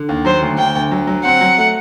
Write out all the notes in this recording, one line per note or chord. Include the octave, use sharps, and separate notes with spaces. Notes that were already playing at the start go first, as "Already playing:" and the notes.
Already playing: D3
D#2
F#3 C5
D2
D2 G5
D2
F#3
F#3
C4 F#5
F#3
A3